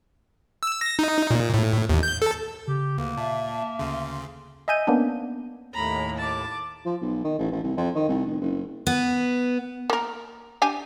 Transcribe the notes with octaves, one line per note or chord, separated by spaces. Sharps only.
E6
A#6
D#4
A#2
A2
D#2
G6
A4
C#3 G4
D2 A#3 B4
A#2 E5 A5
D2 C#3 C6
D#5 E5 G#5 G6 D#7
A#3 B3 C#4 D4
D#2 A2 A#5 B5
A5 D6
F3
B1
D#3
A1
A1
C2
F2
D#3
C2
F1
F#1
B3
A#3 A#4
D4 G4 G#5